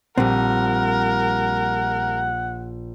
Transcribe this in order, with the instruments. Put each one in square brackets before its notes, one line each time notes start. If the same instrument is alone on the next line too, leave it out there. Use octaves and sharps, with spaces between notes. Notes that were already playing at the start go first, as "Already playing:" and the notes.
[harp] A#1 [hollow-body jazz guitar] G3 C4 [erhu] A#4 [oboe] F#5